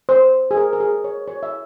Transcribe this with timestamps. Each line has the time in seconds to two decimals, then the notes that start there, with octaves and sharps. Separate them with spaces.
0.09 C5
0.51 G#4
0.57 A#4
0.73 A#4
0.80 G#4
1.04 C#5
1.28 C#5
1.43 E5